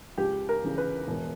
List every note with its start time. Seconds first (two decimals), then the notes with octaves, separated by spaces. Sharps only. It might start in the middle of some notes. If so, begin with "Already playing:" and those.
0.18 C#2 G4
0.49 A#4
0.64 C#3 E3
0.78 B4
1.08 E1